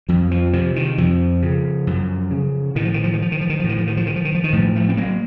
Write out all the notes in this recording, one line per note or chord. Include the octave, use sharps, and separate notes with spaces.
F2 F3
F3
C3 F3
D#3
F2 F3
C#3
F#2
C#3
A2 D#3
F3
D#3
F3
D#3
F3
D#3
F3
D#3
F3
A2 D#3
F3
D#3
F3
D#3
F3
D#3
F3
D#3
A2 F3
F3 A3
C4
F#3 A#3